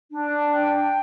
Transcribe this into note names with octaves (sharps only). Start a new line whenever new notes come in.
D4
G5